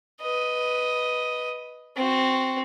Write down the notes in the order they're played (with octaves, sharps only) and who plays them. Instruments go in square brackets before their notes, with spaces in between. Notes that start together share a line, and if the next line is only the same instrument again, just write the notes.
[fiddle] B4 D#5
C4 F#4